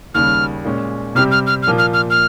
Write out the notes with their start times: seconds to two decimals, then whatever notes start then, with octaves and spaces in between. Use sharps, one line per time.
0.14 D#2 C#3 G3 F6
0.64 A#2 G#3 C#4
1.15 C3 G3 C4 G4 F6
1.31 F6
1.47 F6
1.63 F6
1.67 A#2 F3 A#3 F4
1.78 F6
1.93 F6
2.10 F6